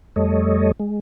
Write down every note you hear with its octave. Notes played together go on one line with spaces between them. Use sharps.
F2 G3 A3 A4 C#5 D#5
G#3